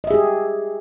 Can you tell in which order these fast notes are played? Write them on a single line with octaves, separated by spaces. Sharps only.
D#5 E5 G#4 G4